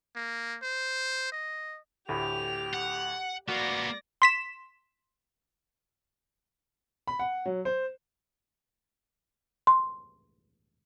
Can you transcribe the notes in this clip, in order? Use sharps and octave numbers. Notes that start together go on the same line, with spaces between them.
A#3
C5
D#5
D2 A2 G4 B5 F7
F#5
A#3 B3 F#4 D5 A#6
C6 B6 E7
B5
F#5
F#3
C5
C6